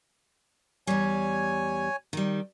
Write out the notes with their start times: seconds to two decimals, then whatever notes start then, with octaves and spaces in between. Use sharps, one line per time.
0.87 E2 G3 C#5 G#5
2.13 D#3 G3